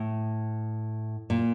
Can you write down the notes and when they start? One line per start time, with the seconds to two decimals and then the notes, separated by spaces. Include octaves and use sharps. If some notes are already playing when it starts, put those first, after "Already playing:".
Already playing: A2
1.30 A#2